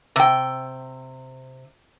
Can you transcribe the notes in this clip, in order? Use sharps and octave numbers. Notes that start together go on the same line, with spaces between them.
C3 G5